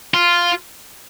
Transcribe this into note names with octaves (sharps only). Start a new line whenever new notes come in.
F4